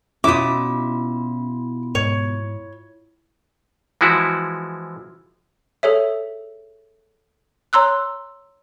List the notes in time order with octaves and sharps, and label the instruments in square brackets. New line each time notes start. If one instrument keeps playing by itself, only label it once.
[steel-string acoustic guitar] B2 E5 [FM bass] C#4 [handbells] E4 F4 [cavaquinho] D6 D#6
[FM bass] G#2 [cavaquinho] C#5
[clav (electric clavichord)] E3 F3 G#3 E4 F#4
[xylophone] G#4 A4 C#5 E5
C#5 A#5 C6 E6 F#6